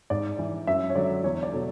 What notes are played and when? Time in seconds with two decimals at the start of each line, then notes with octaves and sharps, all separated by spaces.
0.10 G#2 D5
0.39 E3
0.67 F#2 E5
0.90 C#5
0.95 D3 F#3 D5
1.24 E2 C#5
1.35 C#5
1.43 D5
1.52 B2 F#3 A4